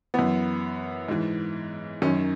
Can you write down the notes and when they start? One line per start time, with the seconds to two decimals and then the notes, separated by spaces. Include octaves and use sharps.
0.14 F#2 E3 B3
1.08 G#2 E3
2.02 F#2 D#3 C#4